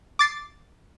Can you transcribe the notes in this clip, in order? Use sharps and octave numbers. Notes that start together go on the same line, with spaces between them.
D6 A6 C7 D7